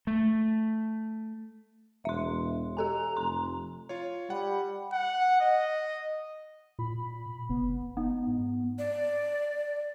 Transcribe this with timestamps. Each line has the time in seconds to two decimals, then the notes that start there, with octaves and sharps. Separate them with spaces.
0.07 A3
2.05 E1 E5 C6
2.77 G4 A4 G#5 A#5
3.17 F1 C6
3.89 F4 C#5
4.30 G3 F#5
4.93 F#5
5.40 D#5
6.79 A#2 B5
7.49 F#1 B3
7.97 B3 D#4
8.27 G#2
8.78 D5